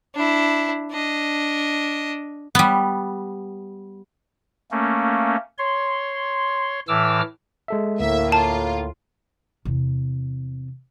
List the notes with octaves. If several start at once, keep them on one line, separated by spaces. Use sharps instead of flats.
D4 E4
D4 D#5
G3 B3
A3 A#3 C#4
C#5 C6
A2 E3 D6 E6 F6
G#3 A4 E5
D2 A2 A#3 E5
F4 A5
E2 C3